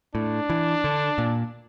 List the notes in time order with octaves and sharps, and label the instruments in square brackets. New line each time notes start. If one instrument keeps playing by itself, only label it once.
[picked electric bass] A2 [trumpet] D4
[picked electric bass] E3
D3
A#2